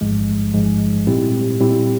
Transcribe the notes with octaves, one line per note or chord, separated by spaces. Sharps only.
A1 G#2 F3 G#3
A1 G#2 F3 G#3
A#2 G3 C4 E4 G4
A#2 G3 C4 E4 G4